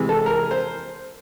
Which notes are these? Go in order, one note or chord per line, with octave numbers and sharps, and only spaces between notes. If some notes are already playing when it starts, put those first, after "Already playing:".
Already playing: C3 E3 G#3
A4
A#4
C5